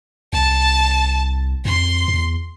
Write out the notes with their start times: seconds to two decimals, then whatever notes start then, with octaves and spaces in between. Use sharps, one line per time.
0.33 C2 A5
1.65 F2 C6
2.08 E2